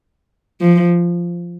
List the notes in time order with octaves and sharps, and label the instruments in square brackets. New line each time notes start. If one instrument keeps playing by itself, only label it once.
[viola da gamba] F3